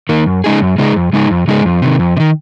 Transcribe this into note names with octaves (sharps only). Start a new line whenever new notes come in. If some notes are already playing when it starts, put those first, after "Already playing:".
D#3 A#3
F#2
C#3 G#3 D#4 G#4
F#2
C#3 G#3 D#4 G#4
F2
C#3 G#3 D#4 G#4
F2
C#3 G#3 D#4 G#4
F2
C3 D#3
F2
C3
D#3